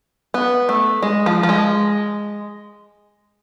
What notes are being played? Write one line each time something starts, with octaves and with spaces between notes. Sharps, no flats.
B3
A3
G#3
F3
F3
G#3